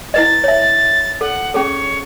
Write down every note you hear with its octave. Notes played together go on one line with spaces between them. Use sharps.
E4 B4 D#5 A6
C#5 E5
A4 F#5
C#4 G#4 A4 C#5